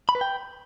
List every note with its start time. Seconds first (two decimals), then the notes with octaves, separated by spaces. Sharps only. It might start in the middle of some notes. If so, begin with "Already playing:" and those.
0.09 B5
0.15 B4
0.21 G5